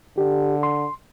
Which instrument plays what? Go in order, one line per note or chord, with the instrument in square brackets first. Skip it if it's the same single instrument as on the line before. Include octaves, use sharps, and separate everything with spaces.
[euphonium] D3 [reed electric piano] G4
[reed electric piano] C6